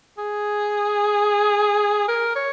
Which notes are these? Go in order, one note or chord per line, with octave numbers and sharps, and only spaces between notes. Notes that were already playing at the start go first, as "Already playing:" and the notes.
G#4
A#4
C#5